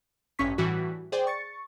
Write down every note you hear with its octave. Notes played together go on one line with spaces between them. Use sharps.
A1 G2 C#4 C#6 B6
A2 E3 G3 F#4 B6
G#4 C5 D5 G5
C#6 A6 C#7